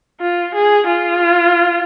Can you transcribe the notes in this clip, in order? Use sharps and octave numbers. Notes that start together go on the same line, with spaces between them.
F4
G#4
F4